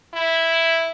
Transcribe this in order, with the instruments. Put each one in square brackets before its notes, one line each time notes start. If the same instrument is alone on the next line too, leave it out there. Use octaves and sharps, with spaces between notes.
[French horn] E4